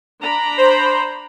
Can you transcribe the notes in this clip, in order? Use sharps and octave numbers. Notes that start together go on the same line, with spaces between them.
D4 A#5 B5
C5